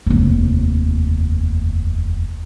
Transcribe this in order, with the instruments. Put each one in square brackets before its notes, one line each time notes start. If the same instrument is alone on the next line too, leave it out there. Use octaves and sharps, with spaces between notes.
[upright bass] F1 D#2